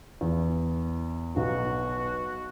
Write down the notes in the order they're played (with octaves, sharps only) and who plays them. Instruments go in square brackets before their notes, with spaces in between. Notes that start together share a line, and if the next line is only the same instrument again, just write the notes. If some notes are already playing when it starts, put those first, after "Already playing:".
[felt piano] E2
[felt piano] B1 F#3 [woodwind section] B2 F#4